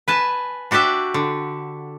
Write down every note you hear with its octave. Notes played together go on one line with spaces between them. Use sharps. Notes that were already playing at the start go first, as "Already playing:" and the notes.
B4 G#5 A5
D4 F#4 G4 D5 E5
D3